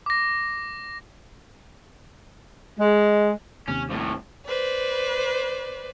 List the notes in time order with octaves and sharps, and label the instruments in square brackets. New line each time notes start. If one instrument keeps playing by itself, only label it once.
[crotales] D6 A#6
[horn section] G#3
[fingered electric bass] D#2 C3 [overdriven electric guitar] C#4
[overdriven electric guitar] C2 A2
[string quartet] B4 C5 D5